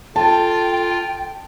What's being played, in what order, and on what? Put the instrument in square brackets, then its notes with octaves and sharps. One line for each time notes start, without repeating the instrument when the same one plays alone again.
[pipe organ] F4 [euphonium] A4 [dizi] G5 [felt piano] A5